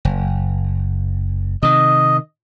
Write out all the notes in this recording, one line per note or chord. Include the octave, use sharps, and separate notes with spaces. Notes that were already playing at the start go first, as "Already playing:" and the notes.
F#1
C3 D#3 D#5